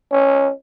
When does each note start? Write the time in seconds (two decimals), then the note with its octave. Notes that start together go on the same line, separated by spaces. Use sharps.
0.12 C#4